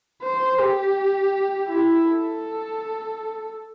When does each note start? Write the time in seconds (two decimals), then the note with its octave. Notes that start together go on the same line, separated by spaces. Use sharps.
0.23 C5
0.60 G4
1.70 E4
2.06 A4